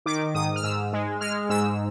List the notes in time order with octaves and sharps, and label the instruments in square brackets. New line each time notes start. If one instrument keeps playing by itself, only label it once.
[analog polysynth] D#3 D6
G#2 D#6
F6
G#2 E6
G#3
G#3 F6
G#2 E6